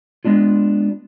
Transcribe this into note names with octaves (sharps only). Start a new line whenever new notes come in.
G#3 B3 D4 F4